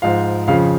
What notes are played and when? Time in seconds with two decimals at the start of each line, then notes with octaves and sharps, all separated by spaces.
0.02 G#2 F3 F5
0.47 F2 C#3 F3 F5